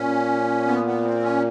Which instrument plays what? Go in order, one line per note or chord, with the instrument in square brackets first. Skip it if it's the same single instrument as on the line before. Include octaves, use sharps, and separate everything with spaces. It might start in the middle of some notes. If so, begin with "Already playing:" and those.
Already playing: [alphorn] A#2 [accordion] C#4
[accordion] B3
B3
C4
C#4